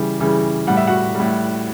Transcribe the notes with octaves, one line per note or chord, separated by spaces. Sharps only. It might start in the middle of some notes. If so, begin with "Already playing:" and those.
Already playing: C#3 E3 G3
C#3 E3 G3
A2 G3 F#5
E5
F#4 F#5
A2 G3